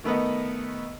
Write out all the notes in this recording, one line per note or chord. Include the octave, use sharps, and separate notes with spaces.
D#3 A3 B3 B4 D#5